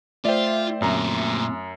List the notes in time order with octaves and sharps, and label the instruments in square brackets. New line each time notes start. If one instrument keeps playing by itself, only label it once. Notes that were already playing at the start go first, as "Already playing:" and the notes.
[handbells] A3 E5 G5 [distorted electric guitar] F4 [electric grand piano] C5 D5
[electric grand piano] F#2 A#5 [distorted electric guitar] A#2 C4